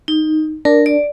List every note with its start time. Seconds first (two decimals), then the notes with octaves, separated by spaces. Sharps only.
0.08 D#4
0.65 D4 A#4
0.86 D5